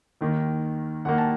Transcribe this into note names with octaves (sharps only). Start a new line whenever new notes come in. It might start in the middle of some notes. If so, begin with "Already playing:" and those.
D#2 D#3 A#3
D#2 D#3 A#3 F#5
A5